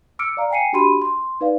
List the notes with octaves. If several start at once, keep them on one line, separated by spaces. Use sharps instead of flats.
D6 E6 F6 C#7 D7
D5 F5 A#5
G5 G#5 C7 C#7 D#7
D4 F#4 G4 B5 C6 D#7
C6
D#4 B4 D5 F5